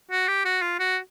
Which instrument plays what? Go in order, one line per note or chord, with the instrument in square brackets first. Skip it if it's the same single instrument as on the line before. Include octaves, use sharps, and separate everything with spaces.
[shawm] F#4
G4
F#4
F4
F#4